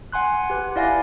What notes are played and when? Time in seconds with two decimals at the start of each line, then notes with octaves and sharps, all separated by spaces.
0.12 F#5 G#5 C6 F#6
0.50 G4 B4
0.76 E4 D5 F5 F#5 G#5 A#6